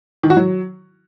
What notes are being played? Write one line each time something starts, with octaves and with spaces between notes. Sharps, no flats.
D#3
F#4
F#3